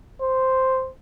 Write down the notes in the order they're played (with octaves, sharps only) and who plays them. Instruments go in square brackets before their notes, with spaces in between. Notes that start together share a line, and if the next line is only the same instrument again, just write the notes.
[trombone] C5